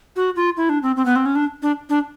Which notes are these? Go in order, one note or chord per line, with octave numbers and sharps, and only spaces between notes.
F#4
F4
E4
D4
C4
C4
B3
C4
C#4
D4
D4
D4